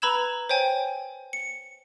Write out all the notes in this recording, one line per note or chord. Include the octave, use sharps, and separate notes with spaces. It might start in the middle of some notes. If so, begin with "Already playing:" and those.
B4 A#5 B5 E6 G#6 E7
C5 C#5 G5 G#5
C#7